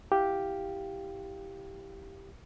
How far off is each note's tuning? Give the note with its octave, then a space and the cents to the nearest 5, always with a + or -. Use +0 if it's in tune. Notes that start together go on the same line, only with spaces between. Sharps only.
E4 +0 G4 +0 F5 +0